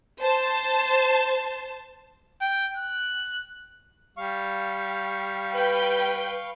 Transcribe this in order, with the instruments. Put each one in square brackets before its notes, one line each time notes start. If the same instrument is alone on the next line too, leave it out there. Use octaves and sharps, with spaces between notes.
[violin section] C5 A5
[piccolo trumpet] G5
F#6
[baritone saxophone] G3 [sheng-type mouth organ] F5 C#6
[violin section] B4 G5 G6